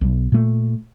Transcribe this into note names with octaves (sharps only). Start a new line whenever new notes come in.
B1
A#2 A3